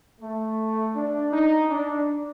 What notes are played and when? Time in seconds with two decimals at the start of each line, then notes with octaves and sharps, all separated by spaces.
0.20 A3
0.94 D4
1.31 D#4
1.68 D4